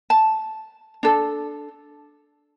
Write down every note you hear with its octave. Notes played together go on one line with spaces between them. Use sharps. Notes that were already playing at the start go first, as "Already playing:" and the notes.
A5
D4 A4